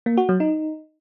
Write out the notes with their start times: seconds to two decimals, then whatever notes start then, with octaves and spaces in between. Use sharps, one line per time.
0.06 A#3
0.17 F#4
0.29 F#3
0.40 D#4